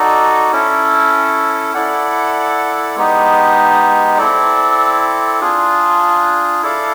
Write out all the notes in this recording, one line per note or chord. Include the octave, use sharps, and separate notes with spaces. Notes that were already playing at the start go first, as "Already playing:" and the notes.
Already playing: D#4 F#4 A4 D5
C#4 E4 A4
E4 A4 D5 F#5
G#3 B3 D#4 G4
C4 E4 A4 D5
D4 F4 G#4
E4 A4 D5 F5